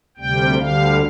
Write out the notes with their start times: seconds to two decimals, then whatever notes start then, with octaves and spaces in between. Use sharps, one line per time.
0.17 D2 C3 G3 G5
0.59 D2 D3 G3 F5